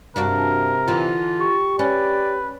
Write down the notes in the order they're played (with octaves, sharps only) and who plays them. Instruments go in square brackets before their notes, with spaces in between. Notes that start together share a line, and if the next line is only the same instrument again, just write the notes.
[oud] G2 D4 F#4 [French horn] C3 [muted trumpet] A#4
[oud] D3 E3 [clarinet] F4
[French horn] G4 [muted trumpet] C#6
[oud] C#4 [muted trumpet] B4 [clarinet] D5